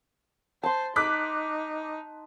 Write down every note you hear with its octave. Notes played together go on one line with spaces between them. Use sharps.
C5 A5 C6
D#4 D6 F#6 B6